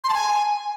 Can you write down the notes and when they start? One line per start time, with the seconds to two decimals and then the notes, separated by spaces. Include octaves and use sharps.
0.04 C6
0.09 A5
0.14 G#5